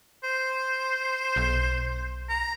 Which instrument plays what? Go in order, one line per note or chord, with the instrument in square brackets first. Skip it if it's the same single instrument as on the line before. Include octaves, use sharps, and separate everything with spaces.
[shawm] C5
[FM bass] B1
[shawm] A#5